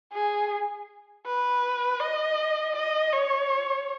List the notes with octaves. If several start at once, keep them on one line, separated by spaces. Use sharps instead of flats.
G#4
B4
D#5
D#5
C#5